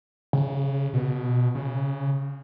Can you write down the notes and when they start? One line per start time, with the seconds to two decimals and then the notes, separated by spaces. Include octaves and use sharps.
0.33 C#3
0.94 B2
1.55 C#3